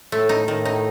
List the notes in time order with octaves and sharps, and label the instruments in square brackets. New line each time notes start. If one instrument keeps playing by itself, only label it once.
[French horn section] A2 [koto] A3
[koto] D#4
[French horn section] A2 [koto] D#3
[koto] D#4